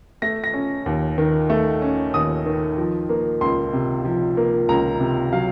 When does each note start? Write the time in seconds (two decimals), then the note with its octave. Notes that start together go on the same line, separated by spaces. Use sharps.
0.22 A3 A#6
0.44 A#6
0.54 C#4
0.86 D#2
1.18 D#3
1.50 A3
1.82 C#4
2.14 D#2 D#6
2.46 D#3
2.77 F3
3.09 A#3
3.41 C#2 C6
3.73 C3
4.05 F3
4.37 A#3
4.69 C#2 A#5
5.00 C3
5.33 F#3 F5